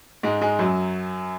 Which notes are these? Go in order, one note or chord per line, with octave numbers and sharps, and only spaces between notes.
G#2 G#3
G#2 G#3
F#2 F#3